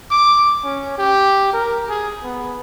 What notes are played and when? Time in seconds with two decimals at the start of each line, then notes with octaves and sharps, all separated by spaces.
0.11 D6
0.64 C#4
0.98 G4
1.53 A#4
1.89 G#4
2.24 B3